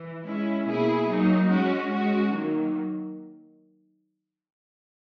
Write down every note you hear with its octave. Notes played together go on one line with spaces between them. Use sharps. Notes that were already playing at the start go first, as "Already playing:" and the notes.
Already playing: E3
G#3 C#4 E4
B2 A#3 E4 G#4
F#3 A#3 D#4
G#3 C#4 F#4
G#3 C#4 F#4
D#3 F#3 A#3